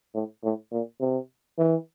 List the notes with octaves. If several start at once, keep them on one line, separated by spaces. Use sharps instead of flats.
A2
A2
A#2
C3
E3